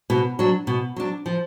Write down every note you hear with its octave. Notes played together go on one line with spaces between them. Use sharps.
B2
F#3 D4
B2
F#3 D4
F3